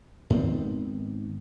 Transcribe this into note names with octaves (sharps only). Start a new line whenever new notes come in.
G#2 D#3 B3 C4